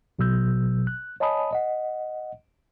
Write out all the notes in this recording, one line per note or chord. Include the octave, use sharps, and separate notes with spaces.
G#1 B2 F#3 E6 G6
F#6
C#5 D#5 G#5 A5 B5 D#6
D#5 F#5